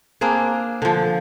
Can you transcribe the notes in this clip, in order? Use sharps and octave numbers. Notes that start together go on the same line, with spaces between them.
A#3 C4 D4 G#4
D3 F3